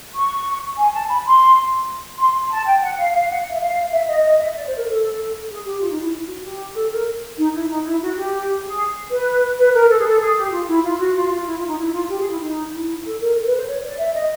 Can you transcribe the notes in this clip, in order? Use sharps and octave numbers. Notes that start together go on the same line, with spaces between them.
C#6
G#5
A5
B5
C6
C6
A5
G5
F#5
F5
F5
F#5
E5
F5
E5
D#5
D#5
E5
D5
C5
A#4
A4
G#4
G4
F4
D#4
E4
F#4
G4
A4
A#4
D#4
E4
D#4
E4
F#4
G4
G#4
B4
B4
A#4
A4
G#4
A4
G#4
G4
F4
E4
F4
F#4
F4
F4
E4
F4
D#4
E4
F4
G4
G#4
E4
D#4
E4
A4
A#4
A4
B4
C5
C#5
D5
E5
D#5